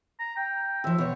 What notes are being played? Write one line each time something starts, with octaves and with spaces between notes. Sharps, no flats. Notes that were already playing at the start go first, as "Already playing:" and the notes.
A#5
G5
D#2 F3 E5
B2 C#5